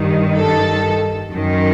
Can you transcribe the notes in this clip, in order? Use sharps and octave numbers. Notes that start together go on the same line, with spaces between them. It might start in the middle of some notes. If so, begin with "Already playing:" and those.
Already playing: G2 D#3
A4
F#2 D#3